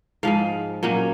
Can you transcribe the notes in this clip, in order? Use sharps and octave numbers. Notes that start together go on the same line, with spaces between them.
G#2 F3 G#3 F5
A#2 F#3 A#3 C#4